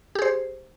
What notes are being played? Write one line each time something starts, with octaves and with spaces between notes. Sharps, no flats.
G4 G#4 C5